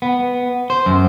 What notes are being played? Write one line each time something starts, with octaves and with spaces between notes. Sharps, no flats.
B3
C5
F#2